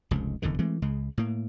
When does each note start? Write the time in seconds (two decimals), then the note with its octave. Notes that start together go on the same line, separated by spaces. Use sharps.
0.11 F1 C#2 G#2
0.42 F1 E2 D3 D#3
0.59 E3 G#3 A3 C4
0.82 C#2 C#3 G#3
1.17 A2 A#3